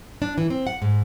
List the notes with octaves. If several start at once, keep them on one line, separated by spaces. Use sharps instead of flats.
D4
E3
C4
F#5
G#2